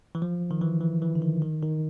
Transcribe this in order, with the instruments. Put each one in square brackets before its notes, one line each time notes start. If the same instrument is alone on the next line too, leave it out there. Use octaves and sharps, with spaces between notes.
[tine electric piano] E3
F3
D#3
E3
E3
E3
D3
D#3
D#3
D#3